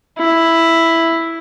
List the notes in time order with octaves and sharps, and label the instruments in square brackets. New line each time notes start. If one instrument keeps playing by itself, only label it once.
[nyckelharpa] E4